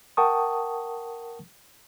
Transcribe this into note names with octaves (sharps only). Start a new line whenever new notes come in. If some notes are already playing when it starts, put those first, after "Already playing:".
A#4 F#5 G5 A5 C#6 D#6